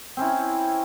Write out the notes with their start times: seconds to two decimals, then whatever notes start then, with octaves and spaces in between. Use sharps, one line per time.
0.17 C4 C#4 E4